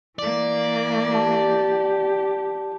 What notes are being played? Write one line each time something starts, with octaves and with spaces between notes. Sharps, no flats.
E3 A#3 D5
G4 A5